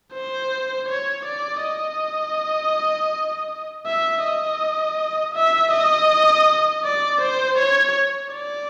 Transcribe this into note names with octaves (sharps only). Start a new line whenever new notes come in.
C5
C#5
D5
D#5
E5
D#5
E5
D#5
D5
C5
C#5
D5